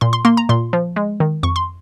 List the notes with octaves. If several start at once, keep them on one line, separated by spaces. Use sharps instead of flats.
A#2 C6
C6
A#3 C6
A#5
A#2 C6
F3
G#3
D#3
F2 C#6
C6